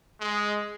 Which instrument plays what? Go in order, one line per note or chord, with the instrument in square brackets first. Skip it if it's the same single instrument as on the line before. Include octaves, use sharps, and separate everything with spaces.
[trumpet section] G#3